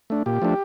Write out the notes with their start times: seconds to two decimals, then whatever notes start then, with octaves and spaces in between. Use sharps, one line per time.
0.10 A3 D4
0.26 A#2 G4
0.42 F3 A3 D4